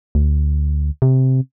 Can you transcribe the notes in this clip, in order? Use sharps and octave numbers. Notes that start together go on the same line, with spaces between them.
D2
C3